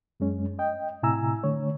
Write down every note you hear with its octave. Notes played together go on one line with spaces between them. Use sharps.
F#2 G#3 C#4
D#5 G5
A2 C3 E4 G#5 A#5 E6
D3 A3 C#5